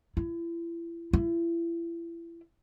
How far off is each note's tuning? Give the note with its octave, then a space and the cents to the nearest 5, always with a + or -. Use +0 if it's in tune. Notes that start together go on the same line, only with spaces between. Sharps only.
E4 +35
E4 +35